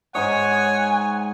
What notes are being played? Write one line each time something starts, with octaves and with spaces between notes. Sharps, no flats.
G#2 C#5 D#5 F#5 G#5